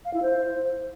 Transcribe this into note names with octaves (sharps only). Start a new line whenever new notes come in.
F5
E4
C5